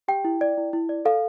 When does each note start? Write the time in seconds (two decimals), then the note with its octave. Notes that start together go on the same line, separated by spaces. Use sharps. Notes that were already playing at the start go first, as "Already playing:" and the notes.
0.08 G4 G5
0.25 E4
0.41 D5
0.57 E4
0.73 E4
0.89 D5
1.05 A4 F5